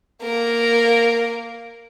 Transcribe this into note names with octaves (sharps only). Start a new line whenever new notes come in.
A#3 A#4